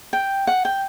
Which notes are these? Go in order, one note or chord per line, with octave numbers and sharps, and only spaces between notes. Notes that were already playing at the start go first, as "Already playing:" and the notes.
G5
F#5
G5